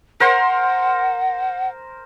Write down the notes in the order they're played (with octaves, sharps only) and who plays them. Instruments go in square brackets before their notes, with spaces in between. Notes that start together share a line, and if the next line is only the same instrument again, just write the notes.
[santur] A#4 C5 C6 [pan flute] F#5